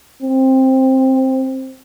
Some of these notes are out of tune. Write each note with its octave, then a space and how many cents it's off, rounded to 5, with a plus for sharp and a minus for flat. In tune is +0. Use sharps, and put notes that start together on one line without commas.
C4 +10